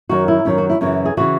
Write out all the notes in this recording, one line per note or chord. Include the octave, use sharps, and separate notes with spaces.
F#2 D#3 F#3 F#4
E4
F#2 D#3 F#3 C#4
F#4
E4
F#2 C#3 E3 F#4
G#4
C#3 E3 F#4